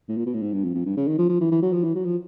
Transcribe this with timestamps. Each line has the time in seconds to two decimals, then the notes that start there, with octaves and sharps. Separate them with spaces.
0.09 A2
0.17 A#2
0.26 B2
0.34 A2
0.42 G#2
0.52 G2
0.63 F2
0.74 F2
0.85 G2
0.97 C#3
1.07 D#3
1.18 F3
1.29 F3
1.41 E3
1.51 E3
1.62 F#3
1.73 F3
1.84 E3
1.95 F#3
2.05 F3